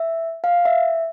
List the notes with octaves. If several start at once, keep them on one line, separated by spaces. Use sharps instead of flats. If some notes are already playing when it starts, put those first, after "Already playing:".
Already playing: E5
F5
E5